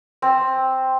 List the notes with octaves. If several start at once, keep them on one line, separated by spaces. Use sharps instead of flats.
C4